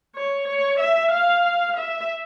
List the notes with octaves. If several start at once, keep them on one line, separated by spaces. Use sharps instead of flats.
C#5
C#5
E5
F5
E5